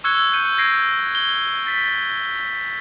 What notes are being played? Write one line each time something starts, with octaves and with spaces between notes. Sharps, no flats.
C#6 E6 F#6 G#6 C#7 G7
F#6 G6 C#7 D#7 F#7
G6 G#6 A#6 C7 D7
F#7 G7
A6 B6